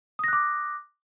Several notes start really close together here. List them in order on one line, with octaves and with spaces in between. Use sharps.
D#6 A#6 F#6 D6